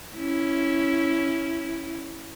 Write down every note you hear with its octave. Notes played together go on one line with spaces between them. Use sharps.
C#4 E4